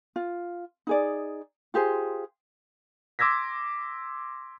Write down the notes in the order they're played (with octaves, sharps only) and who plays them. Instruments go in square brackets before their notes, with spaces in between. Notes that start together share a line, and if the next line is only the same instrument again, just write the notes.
[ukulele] F4
D#4 G#4 D5
F4 G4 G#4 C5
[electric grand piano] C6 D6 E6 G#6 A#6 B6